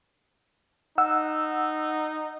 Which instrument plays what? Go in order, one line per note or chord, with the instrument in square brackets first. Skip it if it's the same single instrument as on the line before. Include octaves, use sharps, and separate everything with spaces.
[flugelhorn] D#4 [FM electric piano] F#5 E6